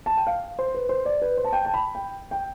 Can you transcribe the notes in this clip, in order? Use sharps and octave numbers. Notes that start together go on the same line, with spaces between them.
A5
G5
F5
C5
B4
C5
D5
B4
C5
A5
G5
A5
B5
G5
G5